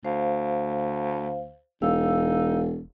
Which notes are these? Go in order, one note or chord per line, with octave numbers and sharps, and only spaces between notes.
D2 C5 F5
E1 D#4 F5 E6